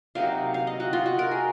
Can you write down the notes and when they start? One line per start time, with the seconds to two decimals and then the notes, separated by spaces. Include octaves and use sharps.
0.15 C3 F#3 A#3 D#4 F5
0.54 F5
0.67 D#5
0.80 F#4
0.93 F4
1.06 F#4
1.19 A#4
1.32 G#4